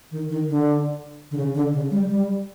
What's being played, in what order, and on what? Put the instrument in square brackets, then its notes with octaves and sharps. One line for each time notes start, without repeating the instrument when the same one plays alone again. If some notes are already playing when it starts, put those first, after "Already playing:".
[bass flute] D#3
D#3
D3
D3
C#3
D3
C#3
G3
G3